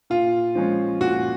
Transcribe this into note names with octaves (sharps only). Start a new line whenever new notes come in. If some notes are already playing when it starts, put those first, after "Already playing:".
A#2 F4
F3 G#3 C#4
A#2 F#4